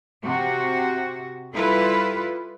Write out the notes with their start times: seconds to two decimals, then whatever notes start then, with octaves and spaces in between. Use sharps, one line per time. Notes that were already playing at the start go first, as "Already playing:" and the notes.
0.24 C3 F#4
1.54 G3 E4 F4 A4 B4